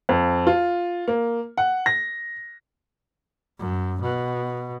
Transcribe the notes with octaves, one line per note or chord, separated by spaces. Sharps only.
F2
F4
A#3
F#5
A#6
F#2
B2